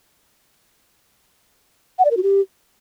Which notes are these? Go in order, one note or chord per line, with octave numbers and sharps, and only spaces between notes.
F#5
D5
A#4
F#4
G4